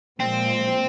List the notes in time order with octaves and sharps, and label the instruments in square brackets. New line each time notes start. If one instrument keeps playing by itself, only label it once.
[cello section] A#2 F3 G#3 [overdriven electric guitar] C4